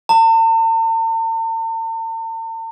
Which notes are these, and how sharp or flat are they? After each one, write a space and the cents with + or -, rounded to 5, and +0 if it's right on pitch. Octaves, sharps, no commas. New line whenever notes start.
A5 +45